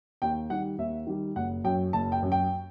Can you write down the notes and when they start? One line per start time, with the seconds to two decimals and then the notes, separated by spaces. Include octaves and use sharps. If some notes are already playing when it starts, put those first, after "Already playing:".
0.22 D#2 G5
0.50 D#3 G3 F#5
0.78 D#2 E5
1.07 D#3 G3
1.36 F#1 F#5
1.64 F#2 F#3 G5
1.93 F#1 A5
2.12 G5
2.22 F#2 F#3
2.32 G5